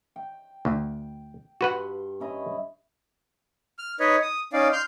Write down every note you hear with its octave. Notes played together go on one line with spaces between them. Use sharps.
G5
D2
G2 F#4 B4 F#5 C6
C#4 E4 D#5
F6
D#4 B4 C#5 D#5
D#6
C#4 D#4 D5 F5
C6 F6 G6